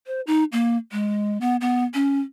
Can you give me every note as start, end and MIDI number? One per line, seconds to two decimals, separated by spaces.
0.07 0.21 72
0.27 0.44 63
0.52 0.77 58
0.92 1.38 56
1.41 1.56 59
1.61 1.84 59
1.94 2.20 61